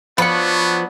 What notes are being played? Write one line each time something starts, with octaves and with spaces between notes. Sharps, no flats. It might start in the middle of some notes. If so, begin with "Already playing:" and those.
F3 F#3 B3 D4 C5 B5 C#6